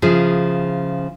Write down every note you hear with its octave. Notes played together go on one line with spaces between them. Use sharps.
C#3 F3 E4 G#4